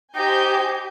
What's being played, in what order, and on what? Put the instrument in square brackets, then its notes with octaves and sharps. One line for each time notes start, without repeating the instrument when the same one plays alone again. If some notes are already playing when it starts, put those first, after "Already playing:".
[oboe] D#4 [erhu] G4 [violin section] C5 G#5 G6